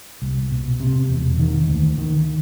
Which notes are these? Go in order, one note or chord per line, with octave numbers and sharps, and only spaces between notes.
C2
B2
C3
E1
D#3
D2
D#3